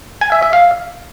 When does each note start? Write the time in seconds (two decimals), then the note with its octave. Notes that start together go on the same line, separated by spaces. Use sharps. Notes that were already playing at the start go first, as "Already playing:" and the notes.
0.21 G#5
0.32 E5
0.43 E5
0.53 F5